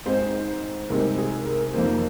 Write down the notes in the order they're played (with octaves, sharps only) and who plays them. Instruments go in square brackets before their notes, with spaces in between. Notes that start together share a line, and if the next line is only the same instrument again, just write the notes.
[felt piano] G#2 G#3 C4 D#4 C5
C2 C3 G#3 C4 D#4 A#4
G#4
A#4
F2 D#3 A#3 C5